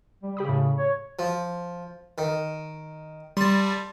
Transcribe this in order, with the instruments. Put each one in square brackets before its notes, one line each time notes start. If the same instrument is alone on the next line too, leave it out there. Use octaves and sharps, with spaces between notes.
[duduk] G3
[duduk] C#3 [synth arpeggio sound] G4 B5 D#6
[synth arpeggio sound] A2
[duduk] C#5
[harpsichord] F3
D#3
[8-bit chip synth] G3 [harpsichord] A5 C6